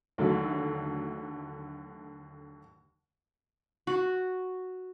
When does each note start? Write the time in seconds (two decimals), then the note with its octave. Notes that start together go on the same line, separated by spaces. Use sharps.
0.18 D#2 D3 F#3 A3
3.87 F#4